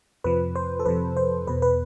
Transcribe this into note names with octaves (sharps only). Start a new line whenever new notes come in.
F2 C3 F3 B4
C5
A4
F2 C3 F3 B4
C5
E2 B2 B4
B4